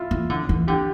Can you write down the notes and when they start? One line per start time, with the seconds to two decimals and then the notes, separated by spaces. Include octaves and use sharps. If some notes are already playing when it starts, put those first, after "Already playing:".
Already playing: E4 F4
0.11 E3
0.30 D3
0.49 E3
0.68 D3 G4